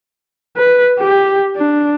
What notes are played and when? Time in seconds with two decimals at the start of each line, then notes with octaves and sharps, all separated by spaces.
0.57 B4
1.00 G4
1.57 D4